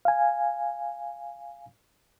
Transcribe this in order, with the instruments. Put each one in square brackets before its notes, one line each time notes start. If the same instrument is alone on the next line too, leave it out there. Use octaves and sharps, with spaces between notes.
[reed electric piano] F5 G#5